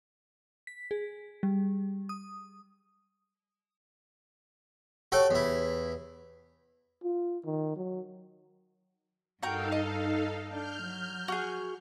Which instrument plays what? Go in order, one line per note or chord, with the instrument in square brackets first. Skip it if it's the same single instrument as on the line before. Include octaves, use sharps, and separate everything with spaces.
[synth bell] B6
G#4
G3
D#6
[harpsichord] F#4 A4 G5 [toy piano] G4 C#5
[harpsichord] E2 E4
[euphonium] F4
D#3
F#3
[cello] G2 [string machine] D#4 A4 F5 [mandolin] F#4 A#4 G5
[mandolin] D#5
[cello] D4 [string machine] F6 G6
[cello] F#3
[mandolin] F#4 G#4